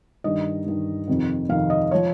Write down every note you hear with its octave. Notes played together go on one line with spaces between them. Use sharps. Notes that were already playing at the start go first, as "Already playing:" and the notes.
G2 D#3 D#5
G2 D#3
F2 C3 D#3
F2 C3 D#3 F5
D#5
F3 C#5